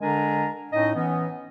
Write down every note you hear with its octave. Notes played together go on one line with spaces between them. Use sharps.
D3 G#3 D4 A#4 G#5 A#5
A2 C#4 D#4 D#5
E3 B3 C#4